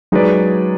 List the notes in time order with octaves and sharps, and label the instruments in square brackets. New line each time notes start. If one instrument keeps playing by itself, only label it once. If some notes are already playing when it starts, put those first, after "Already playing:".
[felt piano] F#3 [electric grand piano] G#3 D#4 G#4 B4 D5